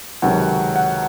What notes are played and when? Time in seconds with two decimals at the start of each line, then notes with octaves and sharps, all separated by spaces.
0.22 C#2 C3 D#3 F#3 F#5
0.76 F#5